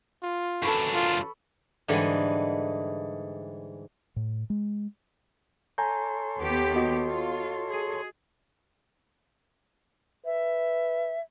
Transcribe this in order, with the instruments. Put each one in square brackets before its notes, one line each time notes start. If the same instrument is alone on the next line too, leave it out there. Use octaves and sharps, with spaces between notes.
[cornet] F4
[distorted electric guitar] F#2 D4 [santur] A4 B4 C#6
[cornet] F4
[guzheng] G#2 D3 E3 G3 G#3
[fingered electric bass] A2
G#3
[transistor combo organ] A4 C#5 C6 [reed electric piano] G#5 A#5 G6
[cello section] D#2 B3 G4
[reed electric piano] F#4 D#5
[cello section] F4
G#4
[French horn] B4 [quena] E5